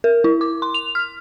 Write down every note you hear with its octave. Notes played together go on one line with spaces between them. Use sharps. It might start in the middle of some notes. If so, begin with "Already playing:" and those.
A#4
E4
D6
C6
F7
F6